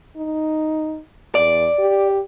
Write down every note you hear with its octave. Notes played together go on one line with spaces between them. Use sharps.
D#4
E2 D5
G4